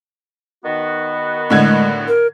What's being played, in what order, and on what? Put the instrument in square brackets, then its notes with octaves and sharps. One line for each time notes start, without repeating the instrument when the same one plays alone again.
[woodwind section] D#3 B3 F#4
[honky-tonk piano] A2 D3 G#6 [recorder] G#3
[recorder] A#4